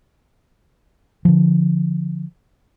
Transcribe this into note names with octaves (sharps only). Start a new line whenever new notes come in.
D3 F3